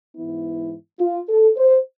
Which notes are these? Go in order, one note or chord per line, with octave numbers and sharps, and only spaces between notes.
G#2 E3 B3 E4
F4
A4
C5